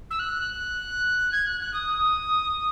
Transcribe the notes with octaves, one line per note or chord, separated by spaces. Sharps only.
E6
F#6
G#6
F#6
F#6
D#6